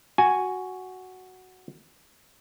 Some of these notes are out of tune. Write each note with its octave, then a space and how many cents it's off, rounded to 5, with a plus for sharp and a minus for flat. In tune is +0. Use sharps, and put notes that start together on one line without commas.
F#4 +0 G#5 +0